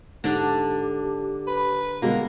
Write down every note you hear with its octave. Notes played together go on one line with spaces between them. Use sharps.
G#2 D3 D4 G4
B4
B2 D3 G#3 A#3